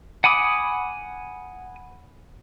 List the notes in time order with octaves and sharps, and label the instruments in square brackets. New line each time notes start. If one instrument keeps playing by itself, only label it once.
[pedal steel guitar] F#5 G#5 B5 D6 D#6